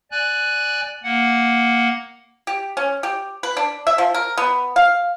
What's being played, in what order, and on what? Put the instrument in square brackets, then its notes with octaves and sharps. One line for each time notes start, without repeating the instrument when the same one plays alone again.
[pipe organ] D5 G#5 F#6
A#3 F#5
[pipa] G4
C#4
G4
B4
D4
E5
F3
A#4
B3
F5